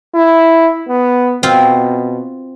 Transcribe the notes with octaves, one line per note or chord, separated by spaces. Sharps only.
E4
B3
B2 C4 F4